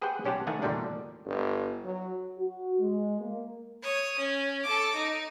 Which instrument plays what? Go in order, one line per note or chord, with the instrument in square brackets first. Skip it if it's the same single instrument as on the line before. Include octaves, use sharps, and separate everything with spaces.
[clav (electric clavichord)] G4 G#4 B4 C5 F#5 G5
B1 C#4 G4 C5 F#5 A5
D#3 E3 A3 A#3 F#5 G#5
E2 A#2 D3 D#3 G3 D4
[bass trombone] G1
F#3
[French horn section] F#4
G#3
A#3
[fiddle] C#5 D#6
C#4
A4 D6
D#4